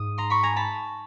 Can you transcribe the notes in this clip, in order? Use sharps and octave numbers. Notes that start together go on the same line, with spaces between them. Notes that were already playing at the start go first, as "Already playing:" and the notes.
Already playing: G#2 D#6
A#5 C6
B5 C#6
G#5 A#5
A5 B5